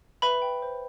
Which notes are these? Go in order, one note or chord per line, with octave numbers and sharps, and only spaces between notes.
B4 E5 B5
G5
C5